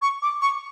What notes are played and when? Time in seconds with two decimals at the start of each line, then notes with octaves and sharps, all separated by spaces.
0.02 C#6
0.22 D6
0.42 C#6